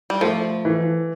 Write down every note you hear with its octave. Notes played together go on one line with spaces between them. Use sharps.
G3
F3 A3
E3